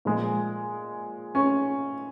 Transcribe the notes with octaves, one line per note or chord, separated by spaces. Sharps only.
A#2 F3 G#3
C#4